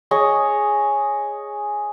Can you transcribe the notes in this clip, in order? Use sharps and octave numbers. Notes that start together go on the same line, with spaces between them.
G#4 C#5 D#5